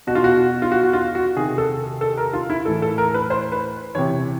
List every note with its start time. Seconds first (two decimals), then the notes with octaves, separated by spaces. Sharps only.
0.07 B2 F#4
0.15 F4
0.24 F#4
0.62 F4
0.72 F#4
0.83 F#4
0.93 F4
1.15 F#4
1.36 C3 D#3 G#4
1.58 A4
2.01 A4
2.17 A#4
2.33 F4
2.50 E4
2.65 A2 E3 A4
2.82 A4
2.98 A#4
3.14 B4
3.30 C5
3.52 B4
3.95 C3 E3 C#5